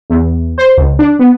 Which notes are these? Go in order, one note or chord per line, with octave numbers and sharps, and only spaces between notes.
E2
C5
C#2
D4
B3